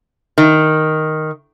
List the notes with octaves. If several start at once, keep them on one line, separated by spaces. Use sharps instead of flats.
D#3